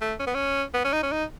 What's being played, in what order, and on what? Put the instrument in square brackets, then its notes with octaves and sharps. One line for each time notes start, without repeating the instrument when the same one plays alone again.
[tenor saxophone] A3
C#4
B3
C#4
B3
C#4
D#4
C#4
D#4